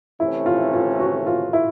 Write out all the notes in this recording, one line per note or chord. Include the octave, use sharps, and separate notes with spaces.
C3 E3 A3 C#4 E4
F4
F4
F#4
F4
E4